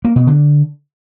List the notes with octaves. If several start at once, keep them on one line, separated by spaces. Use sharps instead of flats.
A#3
B2
D3